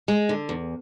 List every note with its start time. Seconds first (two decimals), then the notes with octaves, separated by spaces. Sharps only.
0.08 G#3
0.29 D3
0.49 E2